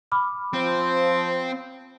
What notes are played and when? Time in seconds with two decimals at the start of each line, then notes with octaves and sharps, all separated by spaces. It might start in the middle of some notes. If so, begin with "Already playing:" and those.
0.12 B5 D6 F6
0.53 F3 C4